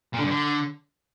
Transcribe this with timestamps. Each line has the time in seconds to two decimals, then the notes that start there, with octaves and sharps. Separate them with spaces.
0.13 A#2
0.19 D3
0.24 G2
0.30 D3